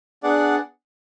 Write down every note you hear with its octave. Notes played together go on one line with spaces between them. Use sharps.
B3 D4 G#4 D5 F#5